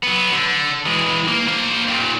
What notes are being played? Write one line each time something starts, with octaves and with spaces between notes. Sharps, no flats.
F#3 B3
D3
E3 G#3
A#3
A#3 C5
D#2 A#2